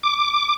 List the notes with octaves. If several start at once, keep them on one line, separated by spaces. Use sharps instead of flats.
D6